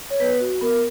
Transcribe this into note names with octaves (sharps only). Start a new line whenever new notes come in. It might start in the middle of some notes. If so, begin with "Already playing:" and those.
C#5
B3 B4
F#4
B3 A#4